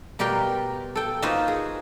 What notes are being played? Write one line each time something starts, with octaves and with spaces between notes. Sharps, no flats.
B2 G3 G4 A#4 G5 C6
A4 G5
A#3 D#4 F4 F#4 B4 C5
G#4